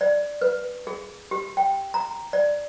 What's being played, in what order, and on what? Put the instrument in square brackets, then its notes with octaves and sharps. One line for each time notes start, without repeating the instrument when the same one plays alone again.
[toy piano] D5
B4
G#4
G4
G5
A#5
D5